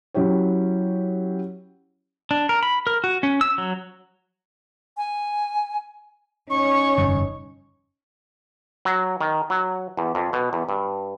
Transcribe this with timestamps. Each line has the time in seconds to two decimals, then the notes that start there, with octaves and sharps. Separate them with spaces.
0.14 F#3 C#4 E4 G4 C#5
2.31 D4
2.49 A#4
2.63 B5
2.87 A#4
3.04 F#4
3.23 C#4
3.41 E6
3.58 F#3
4.97 G#5
6.50 C#4 D#4 C#5 C#6
6.98 F1 G2 D3
8.85 F#3
9.21 D#3
9.50 F#3
9.97 E2
10.15 F2
10.33 B2
10.53 E2
10.69 G2